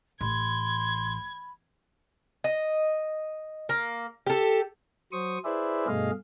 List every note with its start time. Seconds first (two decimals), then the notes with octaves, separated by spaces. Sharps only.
0.21 A1 B5 C6 G#6
2.44 D#5
3.69 A#3
4.26 G4 A4
5.12 F#3 C5 C#6 D#6
5.45 E4 G#4 B4 C5 D5 E5
5.87 G2 B2 A3 G#4 D#5 F5